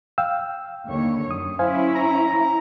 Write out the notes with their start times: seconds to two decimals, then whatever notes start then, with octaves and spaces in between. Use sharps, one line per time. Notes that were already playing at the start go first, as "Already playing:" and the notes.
0.18 F5 G5 E6
0.87 D#2 D3 C#5
1.31 F#2 D#6
1.59 C#4 E4 C5 F5 G#5
1.95 A#5